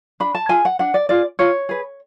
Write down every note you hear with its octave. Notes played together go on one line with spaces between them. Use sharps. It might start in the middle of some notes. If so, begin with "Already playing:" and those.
D4 B5
A5
F4 G#4 G#5
F#5
D4 F#5
D5
F4 G#4 D5
F4 C#5
G#4 B4